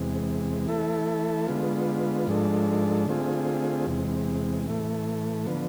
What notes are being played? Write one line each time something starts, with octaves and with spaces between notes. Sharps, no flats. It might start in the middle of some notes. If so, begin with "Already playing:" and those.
Already playing: E2 C3 G#3
E3 A3 E4 A4
D3 G#3 B3 F4
G#2 F3 G#3 D4 A4
D3 A3 C4 F4 G#4
E2 C3 G#3
A2 E3 A3
D3 F3 B3